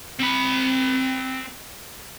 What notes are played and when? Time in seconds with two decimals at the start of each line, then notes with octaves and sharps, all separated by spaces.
0.19 C4 B5